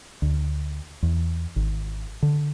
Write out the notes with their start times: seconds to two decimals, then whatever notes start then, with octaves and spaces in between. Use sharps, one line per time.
0.22 D2
1.02 E2
1.56 G#1
2.22 D3